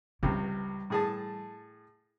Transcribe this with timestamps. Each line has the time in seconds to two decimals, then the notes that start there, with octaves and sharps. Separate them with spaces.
0.23 C#2 C3 E3 G3
0.90 A2 G#4 A5